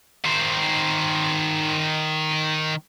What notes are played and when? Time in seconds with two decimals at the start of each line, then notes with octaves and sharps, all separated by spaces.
0.24 D#3 C5